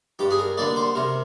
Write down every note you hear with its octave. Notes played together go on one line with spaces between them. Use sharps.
G2 G4
G#4
A#4
D3 G3 A#3 D5
C5
C3 A#4